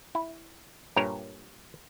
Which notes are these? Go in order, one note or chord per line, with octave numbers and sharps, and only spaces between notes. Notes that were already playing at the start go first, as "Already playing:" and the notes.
E4
G2 A#2 A#4 C#5